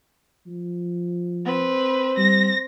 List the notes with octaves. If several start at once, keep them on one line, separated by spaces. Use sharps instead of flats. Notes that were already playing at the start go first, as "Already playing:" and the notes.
F3
C4 B4
G3 A#6